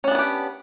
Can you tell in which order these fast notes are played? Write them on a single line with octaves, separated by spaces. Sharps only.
C#4 D4 B3 B4 G4